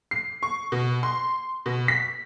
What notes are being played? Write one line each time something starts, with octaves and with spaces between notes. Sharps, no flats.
C7
C#6
B2
C6
B2
B6